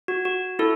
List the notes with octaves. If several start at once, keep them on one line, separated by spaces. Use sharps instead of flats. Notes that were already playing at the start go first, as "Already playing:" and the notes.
F#4
F#4
E4 A4